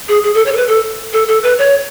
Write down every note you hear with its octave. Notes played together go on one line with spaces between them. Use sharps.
G#4
G#4
A4
C#5
A4
B4
A4
A4
A4
B4
C#5